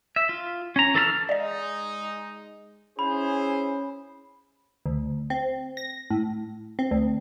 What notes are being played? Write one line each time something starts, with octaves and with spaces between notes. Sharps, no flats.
E5
F4
C#4 A#5
E3 A4 A5 B5 F6
G#3 D#4 D5 D#5
C#4 E4 G#4 C5 B5
D2
C4
A#6
A2
C4
D2